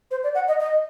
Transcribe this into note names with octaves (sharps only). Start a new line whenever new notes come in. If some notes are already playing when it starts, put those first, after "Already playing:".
C5
D5
F#5
D#5
D#5